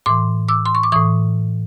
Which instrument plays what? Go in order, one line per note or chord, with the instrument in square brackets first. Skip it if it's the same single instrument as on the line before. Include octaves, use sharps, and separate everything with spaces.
[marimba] A2 E3 C6 D6
D6 E6
C6
C#6
D6
A2 E3 C#6 D#6